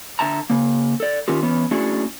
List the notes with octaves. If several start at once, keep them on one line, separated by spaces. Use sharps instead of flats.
D3 E5 A5 A#5
C#3 A#3
A4 D5
D#3 C#4 F4 G4
E3 B3 C#4
A3 C#4 D4 E4 F#4 G#4